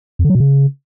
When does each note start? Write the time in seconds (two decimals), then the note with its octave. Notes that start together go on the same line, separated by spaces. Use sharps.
0.19 F2
0.24 D3
0.30 F#3
0.35 B2
0.40 C#3